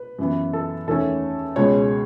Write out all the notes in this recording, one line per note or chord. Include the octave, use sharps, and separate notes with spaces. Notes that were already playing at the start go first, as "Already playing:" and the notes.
Already playing: B4
F#2 E3 B3
A4
E2 D#3 A3 C#4 A4
C#2 B2 G#3 C#5